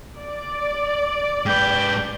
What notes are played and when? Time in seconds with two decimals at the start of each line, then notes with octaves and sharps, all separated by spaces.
0.19 D5
1.46 G#2 B4 G5